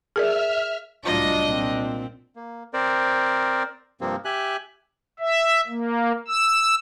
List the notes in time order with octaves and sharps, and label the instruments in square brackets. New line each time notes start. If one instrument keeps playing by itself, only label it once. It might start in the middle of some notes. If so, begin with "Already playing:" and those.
[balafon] G#4 A#4 D5 [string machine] E5 F6
[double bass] C2 D4 [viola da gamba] A2 F#3 F4 [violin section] D#5
[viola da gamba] A#2 C4
[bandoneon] A#3
C4 A#4 C5 D5
G2 C3 F3 A#3 C4
G4 E5 G#5 F#6
[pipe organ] E5
A#3
E6